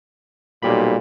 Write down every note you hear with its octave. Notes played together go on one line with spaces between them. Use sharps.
B1 A#2 G3 G4 B5